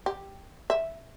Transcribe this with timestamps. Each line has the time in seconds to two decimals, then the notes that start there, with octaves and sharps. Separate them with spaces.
0.06 G4
0.70 E5